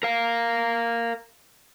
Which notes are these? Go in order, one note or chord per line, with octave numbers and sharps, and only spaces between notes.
A#4 F5